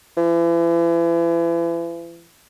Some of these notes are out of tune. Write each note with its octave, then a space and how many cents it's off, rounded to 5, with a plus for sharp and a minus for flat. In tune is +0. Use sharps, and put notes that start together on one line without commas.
E3 +40